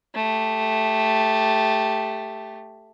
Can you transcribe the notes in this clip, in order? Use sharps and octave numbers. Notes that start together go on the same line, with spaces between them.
A3 G4